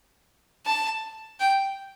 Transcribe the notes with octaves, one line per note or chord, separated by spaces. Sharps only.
A5
G5